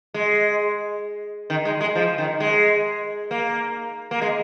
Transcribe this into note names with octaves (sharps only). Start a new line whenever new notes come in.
G#3
D#3
G#3
G#3
F3
D#3
G#3
A#3
A#3
G#3